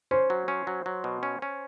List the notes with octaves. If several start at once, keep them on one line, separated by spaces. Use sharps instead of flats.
C#4 C5
F#3
C#4
F#3
F#3
B2
C#4
C#4